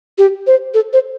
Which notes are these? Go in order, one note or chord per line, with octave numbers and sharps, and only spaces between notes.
G4
C5
A4
C5